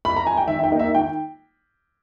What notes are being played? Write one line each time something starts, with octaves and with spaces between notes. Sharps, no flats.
B5
A#5
G#5
G5
D#3 E5
E5
G5
A#3 D#4
E5
D#3 G5